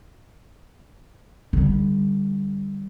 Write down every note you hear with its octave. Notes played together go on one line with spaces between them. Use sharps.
D3 G3